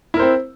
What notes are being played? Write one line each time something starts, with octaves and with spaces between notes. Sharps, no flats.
C4 E4 A#4 C5